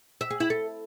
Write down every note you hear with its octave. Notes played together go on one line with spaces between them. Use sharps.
E5
G#4
E4
A4